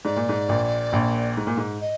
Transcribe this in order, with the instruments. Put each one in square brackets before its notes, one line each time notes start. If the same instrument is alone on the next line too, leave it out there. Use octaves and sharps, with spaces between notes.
[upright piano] G#2 [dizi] D5
[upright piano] A#2
G#2
A#1 A#2
A#1 A#2
G#2
A#2
G#2
[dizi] D#5